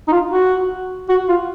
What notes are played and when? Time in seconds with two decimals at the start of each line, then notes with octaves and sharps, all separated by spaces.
0.08 D#4
0.12 F4
0.31 F#4
1.09 F#4
1.29 F4